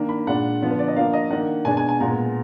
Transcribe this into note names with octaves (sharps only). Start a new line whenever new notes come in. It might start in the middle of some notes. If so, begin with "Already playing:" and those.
Already playing: D#3 A#3 D4
B5
A#2 G#3 D4 F#5
D3 F3 B3 D4
B4
D5
D#5
F3 A#3 D4 F5
D#5
D#3 A#3 D4 F#5
B2 G#3 D4 G#5
G#5
G#5
A#2 G#3 B3 A#5